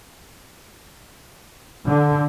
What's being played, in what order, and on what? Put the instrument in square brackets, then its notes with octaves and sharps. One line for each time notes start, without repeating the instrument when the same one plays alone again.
[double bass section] D3